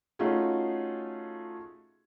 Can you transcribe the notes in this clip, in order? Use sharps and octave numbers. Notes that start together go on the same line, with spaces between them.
A3 C#4 D#4 F4 F#4 G#4